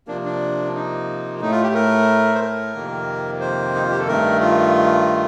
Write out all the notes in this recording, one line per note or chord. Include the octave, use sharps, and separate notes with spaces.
C3 F3 A#3 D4
D4
D#4
A2 A3 D#4
F4
G4
A#4
C5
A#4
F2 C3 D#3 A#3
C5
D#4
F4
G4
A4
G2 D#3 A3 A#4
F4